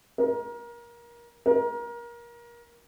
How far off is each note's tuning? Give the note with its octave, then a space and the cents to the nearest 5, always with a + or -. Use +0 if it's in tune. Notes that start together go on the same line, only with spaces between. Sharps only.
A#4 +25
A#4 +25